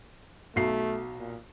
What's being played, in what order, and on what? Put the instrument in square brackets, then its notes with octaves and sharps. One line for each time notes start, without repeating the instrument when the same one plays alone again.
[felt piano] B1 F#3 C7 [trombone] A3
[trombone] A#2